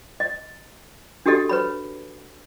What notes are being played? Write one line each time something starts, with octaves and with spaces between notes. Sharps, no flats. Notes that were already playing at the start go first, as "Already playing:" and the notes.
D#5
D4 F#4 G4 A4 D#5
B4 C#5 B5